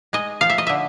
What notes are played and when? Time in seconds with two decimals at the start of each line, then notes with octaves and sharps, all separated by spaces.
0.13 G#3 D#5
0.41 F3 F5
0.50 E5
0.58 D#5
0.67 D3 E5